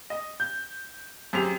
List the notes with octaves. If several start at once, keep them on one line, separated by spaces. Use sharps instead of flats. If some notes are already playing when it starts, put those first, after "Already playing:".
D#5
G6
F#2 C4 G4 G#4 F7